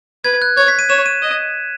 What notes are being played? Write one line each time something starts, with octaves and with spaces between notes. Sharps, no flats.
B4 G#6
F#6
C#5 G#6
B6
D#7
C#5 E7
D#7
D#5